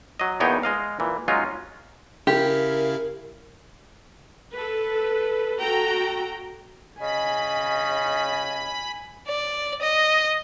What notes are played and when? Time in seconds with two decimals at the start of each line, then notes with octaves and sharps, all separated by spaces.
0.19 F#3 D#5
0.40 E2 A#2 B3 D#4 C#5 G5
0.63 G#3 D#5 F5
1.00 A#2 E3
1.28 F#3 G#3 C#4 D#4 F4
2.27 C#3 E4 G4 A#4 F5
4.53 A4 B4
5.60 F#4 A4 G5 A#5
7.01 C#3 D#5 G#5 B5
9.28 D5
9.82 D#5